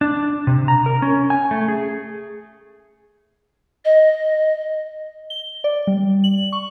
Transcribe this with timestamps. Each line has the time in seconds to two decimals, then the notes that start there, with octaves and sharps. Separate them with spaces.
0.01 D4
0.47 C3
0.68 A#5
0.86 A#4
1.02 C#4
1.30 G#5
1.51 A3
1.68 G#4
3.85 D#5
5.30 G7
5.64 D5
5.87 G3
6.24 F#7
6.52 C#6